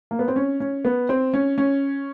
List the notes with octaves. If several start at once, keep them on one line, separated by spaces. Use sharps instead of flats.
A#3
B3
C4
C#4
C#4
B3
C4
C#4
C#4